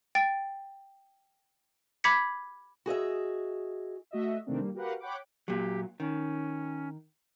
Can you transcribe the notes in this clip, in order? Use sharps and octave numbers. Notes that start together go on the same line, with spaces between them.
G5 A6
B5 D6 G#6 B6 C#7
F#4 G#4 D#5 E5
A3 F#4 D#5 E5
C3 D#3 A3 A#3 C4 D4
G3 A#3
F#4 G4 A#4 B4 F5 F#5
C#5 F#5 G5 B5 D6
A#2 F#3 G4
D#3 C#4